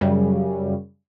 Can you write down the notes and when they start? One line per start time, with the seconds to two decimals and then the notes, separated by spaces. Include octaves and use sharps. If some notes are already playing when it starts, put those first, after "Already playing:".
0.01 F#2 C#3 G3